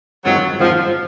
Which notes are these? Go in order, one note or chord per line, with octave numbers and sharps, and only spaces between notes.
G2 D#3 F#3 G#3 C4 F4
G2 D#3 F3 G#3 C4 F4